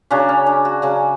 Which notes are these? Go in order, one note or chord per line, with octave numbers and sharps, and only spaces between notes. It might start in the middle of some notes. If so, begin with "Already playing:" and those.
C#3 F#3 C#4 D4
C#4
D4
F#4
C#3 F#3 C#4